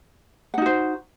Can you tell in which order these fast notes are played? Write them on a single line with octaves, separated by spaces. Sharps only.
F#5 D#4 F#4 C5